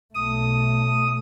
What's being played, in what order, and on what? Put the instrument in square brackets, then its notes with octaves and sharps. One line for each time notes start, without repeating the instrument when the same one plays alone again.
[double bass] B1 A3 [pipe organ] D#6